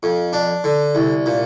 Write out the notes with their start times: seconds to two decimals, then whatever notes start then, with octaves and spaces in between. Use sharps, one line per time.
0.03 F2
0.33 D4
0.64 D3
0.95 C2
1.26 A#2